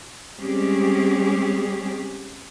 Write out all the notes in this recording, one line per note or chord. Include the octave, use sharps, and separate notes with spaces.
G3 G#3 C4 C#4 G4 G#4